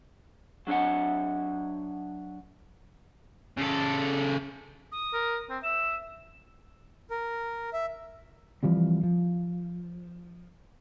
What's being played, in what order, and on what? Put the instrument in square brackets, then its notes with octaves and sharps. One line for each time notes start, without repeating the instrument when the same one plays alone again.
[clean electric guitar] F#3 D4 C#5 F#5
[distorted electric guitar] C#3 A4
[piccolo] D#6
[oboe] A#4
C4
[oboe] E5 [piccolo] E7
[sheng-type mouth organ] A#4
E5
[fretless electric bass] E3 F3 G3 C4
F3